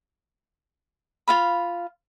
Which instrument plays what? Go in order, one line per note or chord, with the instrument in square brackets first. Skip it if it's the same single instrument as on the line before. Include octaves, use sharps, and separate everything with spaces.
[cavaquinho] F4 F5 B5